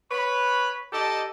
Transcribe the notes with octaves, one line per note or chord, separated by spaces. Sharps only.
B4 C#5 B5
D#4 G4 A4 D5 D#5 A5